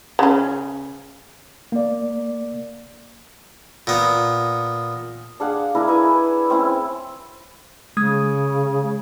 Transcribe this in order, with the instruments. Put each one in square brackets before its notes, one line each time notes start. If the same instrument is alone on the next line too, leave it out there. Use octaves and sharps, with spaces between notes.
[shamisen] C#3 C#4
[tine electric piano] A#3 D5
[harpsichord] A#2 B3
[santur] D4 G#4 F5 F#5
D4 E4 G#4 A#4
B4 E5 G#5
C4 C#4 E4
[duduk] C#3 [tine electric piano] G#3 D#6 G#6